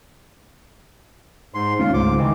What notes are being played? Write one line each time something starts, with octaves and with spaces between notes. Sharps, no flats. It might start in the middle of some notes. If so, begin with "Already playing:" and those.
G#2 C6
G#3 A3 C#4 F4
C#2 G#2 G#3 D6
D#3 E3